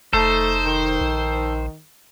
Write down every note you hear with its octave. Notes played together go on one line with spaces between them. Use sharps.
F1 A3 D#4 A4 C5
D#3
A#1